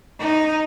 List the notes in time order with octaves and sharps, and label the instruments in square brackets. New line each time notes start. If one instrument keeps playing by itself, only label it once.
[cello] D#4